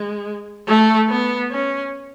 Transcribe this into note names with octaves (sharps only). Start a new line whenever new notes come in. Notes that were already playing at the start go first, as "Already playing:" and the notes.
Already playing: G#3
A3
B3
C#4